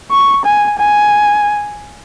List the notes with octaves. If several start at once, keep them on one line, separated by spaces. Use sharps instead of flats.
C#6
G#5
G#5